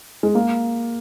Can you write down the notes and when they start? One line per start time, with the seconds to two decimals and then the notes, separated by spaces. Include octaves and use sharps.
0.23 G#3
0.35 A#3